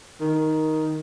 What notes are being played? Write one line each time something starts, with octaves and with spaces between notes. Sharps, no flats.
D#3